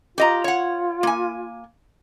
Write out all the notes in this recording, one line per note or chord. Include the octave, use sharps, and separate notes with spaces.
F4 G4 D#5 A#5
C#5 F#5
A#3 G#5